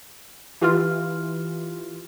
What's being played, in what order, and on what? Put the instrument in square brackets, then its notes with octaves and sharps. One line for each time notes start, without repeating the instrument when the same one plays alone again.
[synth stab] E3 F4 [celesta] G4 F6